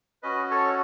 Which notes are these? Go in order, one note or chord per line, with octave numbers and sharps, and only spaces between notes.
C#4 F#4 B4 D#5
A4 C#5